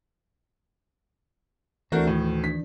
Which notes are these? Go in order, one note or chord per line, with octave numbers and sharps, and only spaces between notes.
D2 E3 A3 C4 D4 F#4 A#4
A2 D#3
D4 B6